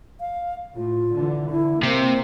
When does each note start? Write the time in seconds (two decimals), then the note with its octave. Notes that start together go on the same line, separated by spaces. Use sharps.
0.20 F5
0.76 A2 F4
1.13 D3 E3
1.50 D3 E4
1.83 C3 A#3 C4